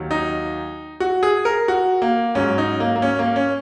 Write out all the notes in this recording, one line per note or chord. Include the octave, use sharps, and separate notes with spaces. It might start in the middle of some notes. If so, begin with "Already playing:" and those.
Already playing: D#2 D#3 F#3
D#4
F#4
G#4
A#4
F#4
A#3
G#2 F#3 C#4
D#4
A#3
A#3
C#4
A#3
C#4